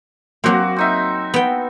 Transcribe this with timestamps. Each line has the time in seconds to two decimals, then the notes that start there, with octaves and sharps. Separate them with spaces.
0.44 F#3 A#3 C4 F#4 D6
0.76 C4 D#4 E5
1.34 B3 G5